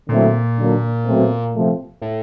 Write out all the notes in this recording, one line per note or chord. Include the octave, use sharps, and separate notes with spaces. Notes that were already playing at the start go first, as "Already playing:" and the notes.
A#2 D3 F#3 A3 C4 E4
D3 F#3 A#3 D4
B2 F#3 A3 C4
C3 F3 A3
A2